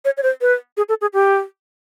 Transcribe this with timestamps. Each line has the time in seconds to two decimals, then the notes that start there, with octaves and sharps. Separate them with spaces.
0.05 C#5
0.17 C#5
0.23 C5
0.41 B4
0.77 G#4
0.89 A4
1.01 G#4
1.13 G4